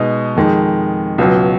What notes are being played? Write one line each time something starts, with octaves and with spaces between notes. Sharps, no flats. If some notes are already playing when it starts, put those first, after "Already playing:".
Already playing: B2 G#3 D#4
F2 D#3 G#3
C#2 B2 F#3